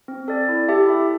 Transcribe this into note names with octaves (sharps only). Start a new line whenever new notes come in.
C4
A4 D5
E4
G4 E5 A5
E4